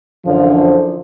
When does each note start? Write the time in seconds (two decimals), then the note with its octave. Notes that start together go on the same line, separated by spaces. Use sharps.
0.25 F#2 D3 E3 F3